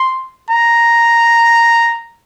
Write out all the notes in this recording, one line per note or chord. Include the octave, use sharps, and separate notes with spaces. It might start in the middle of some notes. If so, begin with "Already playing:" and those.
Already playing: C6
A#5